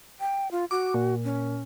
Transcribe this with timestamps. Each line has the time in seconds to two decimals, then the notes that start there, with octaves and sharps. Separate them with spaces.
0.20 G5
0.51 F4
0.71 F#4 D6
0.94 A#2
1.24 C#4